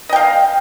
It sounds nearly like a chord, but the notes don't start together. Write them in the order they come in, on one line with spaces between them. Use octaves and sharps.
D#5 G5 F5